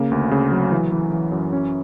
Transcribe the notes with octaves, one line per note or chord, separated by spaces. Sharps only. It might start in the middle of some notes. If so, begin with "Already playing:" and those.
Already playing: C#3 A#3
D2
C#3
F#3
E3
E3
E3
F#2
C#4